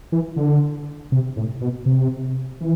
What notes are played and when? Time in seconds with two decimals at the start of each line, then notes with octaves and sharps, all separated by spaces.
0.12 E3
0.36 D3
1.12 C3
1.36 A2
1.61 B2
1.86 C3
2.61 E3